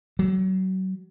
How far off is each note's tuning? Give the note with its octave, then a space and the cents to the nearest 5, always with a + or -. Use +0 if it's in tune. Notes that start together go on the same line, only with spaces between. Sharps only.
F#3 +30